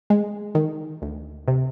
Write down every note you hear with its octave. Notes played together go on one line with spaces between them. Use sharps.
G#3
D#3
D2
C3